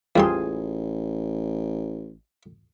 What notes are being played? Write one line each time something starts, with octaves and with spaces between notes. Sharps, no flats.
A1 E2 G3 F4 G#4 C6